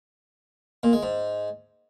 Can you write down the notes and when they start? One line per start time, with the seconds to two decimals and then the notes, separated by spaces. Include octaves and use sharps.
0.83 A#2
0.93 G#3
1.03 G#2